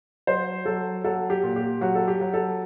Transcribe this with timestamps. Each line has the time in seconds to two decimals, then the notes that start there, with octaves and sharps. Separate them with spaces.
0.27 F#3 C5
0.66 F#3 A4
1.04 F#3 A4
1.30 G4
1.43 A#2
1.56 G4
1.81 F#3 F#4
1.95 A4
2.08 G4
2.21 F#3
2.34 A4